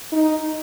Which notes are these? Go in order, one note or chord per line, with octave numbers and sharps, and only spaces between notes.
D#4